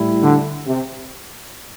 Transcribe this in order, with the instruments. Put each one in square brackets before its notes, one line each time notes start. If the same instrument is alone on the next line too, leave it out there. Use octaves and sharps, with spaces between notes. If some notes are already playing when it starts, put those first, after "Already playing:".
Already playing: [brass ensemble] A2 G3 E4
[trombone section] D3
C3